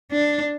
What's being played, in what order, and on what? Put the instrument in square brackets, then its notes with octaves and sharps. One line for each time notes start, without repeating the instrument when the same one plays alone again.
[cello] D4